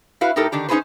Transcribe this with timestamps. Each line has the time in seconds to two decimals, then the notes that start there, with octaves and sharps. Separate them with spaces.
0.21 E4 F#4 B4 F5
0.36 A2 D#4 G4 A4 A#4
0.52 D3 D#3 D4 G4
0.69 C#4 D#4 F4 G#4 B4 C5